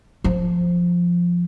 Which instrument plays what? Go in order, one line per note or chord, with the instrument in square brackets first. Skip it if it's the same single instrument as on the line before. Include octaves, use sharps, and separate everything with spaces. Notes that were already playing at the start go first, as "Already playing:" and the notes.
[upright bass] F3